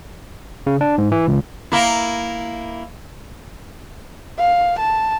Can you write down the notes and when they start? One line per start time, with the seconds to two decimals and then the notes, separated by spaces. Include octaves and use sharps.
0.67 C#3
0.81 D4
0.98 G#2
1.12 E3
1.28 C#2
1.72 A#3 E4
4.39 F5
4.79 A5